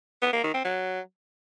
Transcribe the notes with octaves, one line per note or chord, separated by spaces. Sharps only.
B3
A#3
D#3
C4
F#3